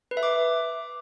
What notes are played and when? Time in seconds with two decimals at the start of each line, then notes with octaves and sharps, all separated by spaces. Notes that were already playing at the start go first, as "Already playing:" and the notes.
0.11 B4
0.17 E5
0.23 D6